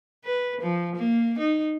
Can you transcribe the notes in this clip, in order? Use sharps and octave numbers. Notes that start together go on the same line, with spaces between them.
B4
F3
A#3
D#4